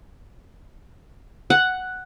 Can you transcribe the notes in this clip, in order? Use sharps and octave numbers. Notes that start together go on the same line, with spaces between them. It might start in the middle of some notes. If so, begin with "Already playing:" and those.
F#5